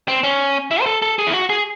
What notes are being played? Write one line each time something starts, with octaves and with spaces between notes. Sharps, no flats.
C4
C#4
E4
C5
A4
A4
G#4
E4
F#4
G#4